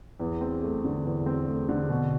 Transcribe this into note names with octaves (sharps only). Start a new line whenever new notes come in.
E2
C4
A3
D3
E2
C4
A3
D3
B2